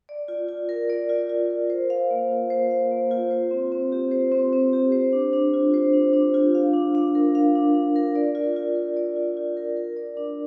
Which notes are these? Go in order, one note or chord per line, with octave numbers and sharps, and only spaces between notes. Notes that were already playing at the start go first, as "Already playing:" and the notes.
D5
F4
F4
A#4
D5
F4
F4
A#4
C5
F5
A#3
F4
C5
F5
A#3
F4
C5
C4
C4
G4
C5
C4
C4
G4
C5
D4
D4
F4
C5
D4
D4
F4
F5
D4
D4
A#4
F5
D4
D4
A#4
D5
F4
F4
A#4
D5
F4
F4
A#4
A#4
D5
D4